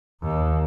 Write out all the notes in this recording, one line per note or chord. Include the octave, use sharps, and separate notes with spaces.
D#2